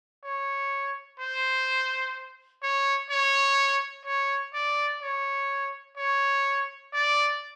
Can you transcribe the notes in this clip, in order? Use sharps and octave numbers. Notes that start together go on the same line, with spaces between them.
C#5
C5
C#5
C#5
C#5
D5
C#5
C#5
D5